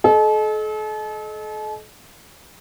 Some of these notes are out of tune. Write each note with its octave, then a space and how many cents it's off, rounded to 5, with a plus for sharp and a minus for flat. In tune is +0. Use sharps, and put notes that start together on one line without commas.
A4 -40 D#5 -10